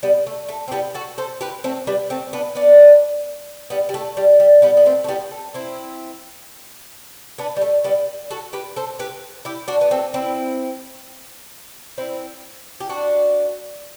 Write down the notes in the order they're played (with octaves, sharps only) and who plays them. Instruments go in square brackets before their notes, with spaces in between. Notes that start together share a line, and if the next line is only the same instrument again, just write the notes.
[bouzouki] G3 B3
A3
A3
C4
G3 B3
F#4 A4
A4 C5
G4 B4
A3 C4
G3 B3
A3 C4
B3 D4
B3 D4
G3 B3
G3
A3
G3
G3
G3 B3
B3
A3 C4
A3
G3 B3
A3
C4 E4
B3 D4
G3
A3
G3 B3
F#4 A4
G4 B4
A4 C5
G4 B4
E4 G4
D4 F#4
B3
A3 C4
C4 E4
C4 E4
G4
D4 F#4